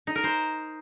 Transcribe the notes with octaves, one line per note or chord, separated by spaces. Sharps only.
D#4
A#4
C5